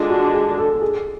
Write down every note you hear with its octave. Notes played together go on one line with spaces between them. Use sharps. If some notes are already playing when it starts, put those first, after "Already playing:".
Already playing: D3 G#3 D4 F4
F#4
G#4
A4
G#4